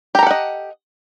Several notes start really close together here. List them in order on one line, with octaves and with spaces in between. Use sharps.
G4 A#5 A4 F#5 D#5